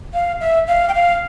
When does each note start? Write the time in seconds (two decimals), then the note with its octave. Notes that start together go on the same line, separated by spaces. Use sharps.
0.14 F5
0.41 E5
0.68 F5
0.89 G5
0.94 F5